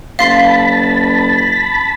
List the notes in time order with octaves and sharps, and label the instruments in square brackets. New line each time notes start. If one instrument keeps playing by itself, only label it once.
[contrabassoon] F#1 [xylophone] F5 C6 C7 [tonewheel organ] A5 B5